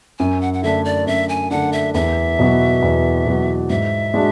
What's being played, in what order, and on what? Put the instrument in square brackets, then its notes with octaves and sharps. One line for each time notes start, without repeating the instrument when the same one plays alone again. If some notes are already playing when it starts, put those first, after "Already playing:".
[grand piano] F#2 [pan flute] G#5
[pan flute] F#5
F#5
[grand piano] D3 A3 D4 [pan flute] E5
[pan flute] D5
[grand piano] F#2 [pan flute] E5
[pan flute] G#5
[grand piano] D3 A3 D4 [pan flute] F#5
[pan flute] E5
[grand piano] E2 [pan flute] E5
[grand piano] B2 F#3 B3 F#4
E2
B2 F#3 B3 F#4
[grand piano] G#2 [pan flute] E5
[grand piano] G#3 D4 F#4